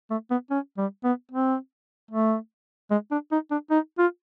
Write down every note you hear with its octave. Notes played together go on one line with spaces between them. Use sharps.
A3
B3
C#4
G3
B3
C4
A3
G#3
D4
D#4
D4
D#4
F4